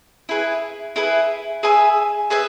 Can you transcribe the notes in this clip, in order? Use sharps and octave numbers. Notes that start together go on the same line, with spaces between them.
E4 G#4 B4
E4 G#4 B4
G#4 B4 E5 G#5
G#4 B4 E5 G#5